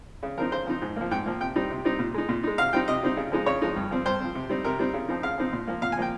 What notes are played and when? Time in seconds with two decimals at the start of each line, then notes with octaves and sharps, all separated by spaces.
0.23 C#3
0.37 F3 C4 D#4 A#4
0.52 C#3 C5
0.67 F3 C4 D#4
0.82 G#2
0.96 F3 A#3
1.11 G#2 G5
1.26 F3 A#3
1.41 C3 G5
1.56 G3 C4 D#4
1.70 C3
1.85 G3 C4 D#4
1.99 A#2
2.14 G#3 D#4
2.29 A#2
2.43 G#3 D#4
2.58 C3 F5
2.73 G3 C4 D#4 G5
2.87 C3 D#5
3.03 G3 C4 D#4
3.17 C#3
3.32 F3 G#3 D#4
3.46 C#3 C#5
3.62 F3 G#3 D#4
3.76 G2
3.91 F3 C4
4.05 G2 C5
4.20 F3 C4
4.35 C3
4.49 G3 C4 D#4
4.64 C3 A#4
4.79 G3 C4 D#4
4.94 C#3
5.09 F3 C4 D#4
5.23 C#3 F5
5.38 F3 C4 D#4
5.53 A#2
5.67 F3 A#3
5.82 A#2 F5
5.92 G#5
5.97 F3 A#3 G5